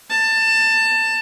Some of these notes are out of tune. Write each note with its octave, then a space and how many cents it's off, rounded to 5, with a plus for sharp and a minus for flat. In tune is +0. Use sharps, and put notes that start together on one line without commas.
A5 +20